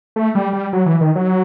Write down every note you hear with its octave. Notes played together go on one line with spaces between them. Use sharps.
A3
G3
G3
F#3
E3
D#3
F#3